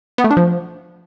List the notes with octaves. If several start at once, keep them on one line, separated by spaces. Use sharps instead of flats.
B3
A3
D4
F3